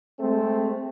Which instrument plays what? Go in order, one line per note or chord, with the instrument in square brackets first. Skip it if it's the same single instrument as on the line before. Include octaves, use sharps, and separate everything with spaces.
[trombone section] G#3 A3 C4